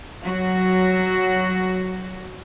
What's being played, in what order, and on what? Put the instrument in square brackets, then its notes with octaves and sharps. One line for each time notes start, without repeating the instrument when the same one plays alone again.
[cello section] F#3 F#4